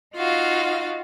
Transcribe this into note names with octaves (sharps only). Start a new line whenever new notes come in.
D#4 F4 F#4 F5